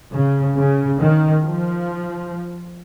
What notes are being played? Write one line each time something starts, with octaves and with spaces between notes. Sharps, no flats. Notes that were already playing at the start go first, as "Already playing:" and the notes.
C#3
C#3
D#3
F3